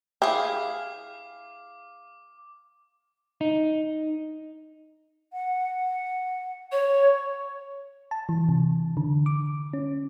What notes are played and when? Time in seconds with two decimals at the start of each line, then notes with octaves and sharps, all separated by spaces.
0.22 E4 G4 G#4 F5 D6
3.41 D#4
5.33 F#5
6.72 C#5 C#6
8.11 A5
8.29 E3
8.49 C3
8.97 D3
9.26 D6
9.73 C#4